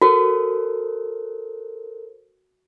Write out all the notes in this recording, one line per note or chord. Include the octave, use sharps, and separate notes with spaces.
F#4 A4 A#4 C5